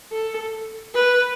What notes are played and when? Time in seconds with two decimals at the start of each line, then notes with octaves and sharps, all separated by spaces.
0.12 A4
0.94 B4